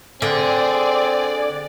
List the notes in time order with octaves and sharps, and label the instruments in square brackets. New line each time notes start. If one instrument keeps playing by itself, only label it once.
[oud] D3 [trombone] C4 [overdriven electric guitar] G#4 [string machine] D5